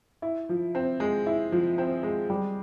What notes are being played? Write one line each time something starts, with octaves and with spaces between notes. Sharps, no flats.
E4
F3
C4
G#3
E4
F3
C4
G#3
G3